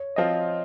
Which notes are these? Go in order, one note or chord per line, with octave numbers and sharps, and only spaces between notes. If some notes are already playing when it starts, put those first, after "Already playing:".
Already playing: C#5
F3 C4 F4 D#5